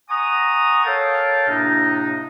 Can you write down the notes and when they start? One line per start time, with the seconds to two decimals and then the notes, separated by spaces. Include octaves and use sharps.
0.09 F#5 G#5 A#5 C#6 D#6
0.85 A4 A#4 C#5 F5 G5 A5
1.48 A2 C3 A#3 D4 D#4